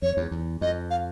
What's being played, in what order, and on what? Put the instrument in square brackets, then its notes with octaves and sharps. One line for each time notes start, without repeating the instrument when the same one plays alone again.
[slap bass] F2 [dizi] C#5
[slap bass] E2
E2
[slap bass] F2 [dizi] D#5
[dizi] F5